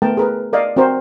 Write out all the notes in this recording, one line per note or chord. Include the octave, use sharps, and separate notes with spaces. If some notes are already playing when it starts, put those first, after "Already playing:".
A3 B3 A#4 G5 A5
G#4 A#4 B4
A#4 D5 D#5 F5
C4 F#4 A#4 C5